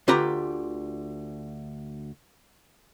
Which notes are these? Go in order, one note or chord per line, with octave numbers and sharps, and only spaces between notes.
D2 F4 G4 B4 A#5